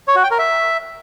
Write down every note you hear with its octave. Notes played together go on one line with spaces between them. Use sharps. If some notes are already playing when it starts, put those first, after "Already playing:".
C#5
F#4
G5
A#4
E5